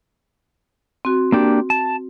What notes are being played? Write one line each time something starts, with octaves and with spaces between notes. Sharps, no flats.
C4 F#4
A#3 D4 G4
A5